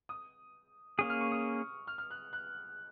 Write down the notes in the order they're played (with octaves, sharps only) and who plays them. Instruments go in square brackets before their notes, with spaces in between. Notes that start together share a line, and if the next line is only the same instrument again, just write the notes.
[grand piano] D#6
[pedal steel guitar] A#3 C#4 G#4 [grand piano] D#6
[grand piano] F6
C#6
D#6
F6
F6
F#6
F#6